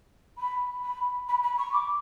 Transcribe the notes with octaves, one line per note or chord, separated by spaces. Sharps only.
B5
B5
B5
B5
C#6
D6